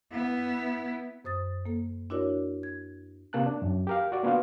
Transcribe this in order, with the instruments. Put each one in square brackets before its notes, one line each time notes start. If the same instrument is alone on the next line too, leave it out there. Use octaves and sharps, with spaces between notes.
[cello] B3 E4
[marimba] F#2 C5 D#6 A6
A#3 A4
D4 E4 F#4 A#4 C#5 D5
G#6
[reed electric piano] C3 A#3 A5 F#6
D4
F#2
G4 A#4 F5
F#4 D5
A#3 B3 D4 F4 F#4 F5